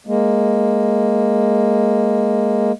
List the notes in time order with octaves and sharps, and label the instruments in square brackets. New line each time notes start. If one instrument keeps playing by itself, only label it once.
[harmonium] G#3 A#3